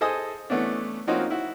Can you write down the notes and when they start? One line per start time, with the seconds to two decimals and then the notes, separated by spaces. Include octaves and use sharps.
0.01 G#4 A4 C5 D#5 G#5 D#6
0.50 E3 A3 B3 C#4 D4
1.07 F3 A#3 C4 C#4 D#4 F#4
1.30 E4 F#4